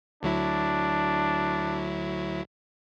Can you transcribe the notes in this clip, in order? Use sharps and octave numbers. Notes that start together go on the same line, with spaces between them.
D2 F#3 D4 E4